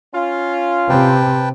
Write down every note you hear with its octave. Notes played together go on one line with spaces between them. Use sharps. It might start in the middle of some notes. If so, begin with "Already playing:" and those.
C#4 F4
C3 B4 G5 A5